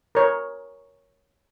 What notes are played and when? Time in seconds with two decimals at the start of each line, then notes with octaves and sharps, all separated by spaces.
0.15 A#4 C#5